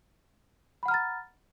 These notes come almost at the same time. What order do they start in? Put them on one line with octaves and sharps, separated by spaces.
B5 F#5 F6 A#5 A6